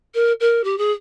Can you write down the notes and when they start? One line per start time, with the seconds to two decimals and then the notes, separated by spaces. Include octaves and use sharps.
0.14 A#4
0.40 A#4
0.64 G4
0.78 G#4